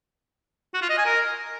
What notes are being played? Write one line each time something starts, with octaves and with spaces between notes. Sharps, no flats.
F#4
F4
D#5
G#5
A#4